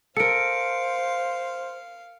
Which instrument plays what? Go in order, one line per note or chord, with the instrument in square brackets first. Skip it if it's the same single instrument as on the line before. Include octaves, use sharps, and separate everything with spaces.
[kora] A4 A#4 [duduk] C5 [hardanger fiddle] F5 [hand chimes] C#7 D7